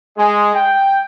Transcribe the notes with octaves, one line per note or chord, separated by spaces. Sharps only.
G#3
G5